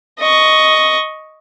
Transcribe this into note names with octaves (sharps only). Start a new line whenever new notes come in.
D#5 C#6